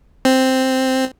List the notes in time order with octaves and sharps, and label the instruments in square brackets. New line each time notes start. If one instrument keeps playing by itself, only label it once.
[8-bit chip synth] C4